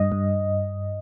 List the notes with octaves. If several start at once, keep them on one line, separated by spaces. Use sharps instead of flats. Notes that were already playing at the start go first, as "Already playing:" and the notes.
Already playing: G2 D#5
G2